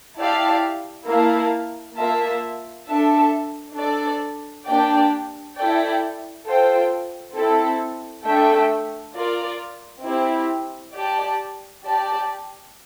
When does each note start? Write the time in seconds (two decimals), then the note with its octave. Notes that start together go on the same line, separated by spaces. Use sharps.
0.18 E4 G4 D5 F5 A5
1.07 A#3 E4 A#4 F5 A5
1.97 A#3 F4 A#4 E5 A5
2.87 D4 A4 E5 A5
3.76 D4 A4 D5
4.66 A#3 D4 G4 D5 G5
5.56 E4 A4 D5 G5
6.45 F4 A4 C5 G5
7.35 C4 E4 A4
8.25 A3 D4 A4 E5 G5
9.15 F4 A#4 D5
10.04 C4 E4 G4
10.94 G4 D5 A5
11.84 G4 D5 A5